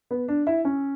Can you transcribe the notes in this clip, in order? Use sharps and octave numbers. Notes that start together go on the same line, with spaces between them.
B3
D4
E4
C#4